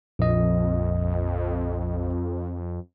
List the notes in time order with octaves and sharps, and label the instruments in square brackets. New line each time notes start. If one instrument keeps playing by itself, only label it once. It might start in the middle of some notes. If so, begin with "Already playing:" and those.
[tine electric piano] A#1 D#5 [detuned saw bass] F2